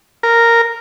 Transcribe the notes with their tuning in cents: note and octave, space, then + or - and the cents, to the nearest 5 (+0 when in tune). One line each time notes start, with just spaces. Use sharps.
A#4 -5